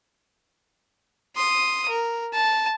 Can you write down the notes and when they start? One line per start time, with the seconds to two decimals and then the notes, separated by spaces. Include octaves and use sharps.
1.36 C6 D#6
1.89 A#4
2.33 A5